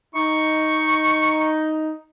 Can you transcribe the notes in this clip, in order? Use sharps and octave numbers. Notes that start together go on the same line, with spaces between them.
D#4 C#6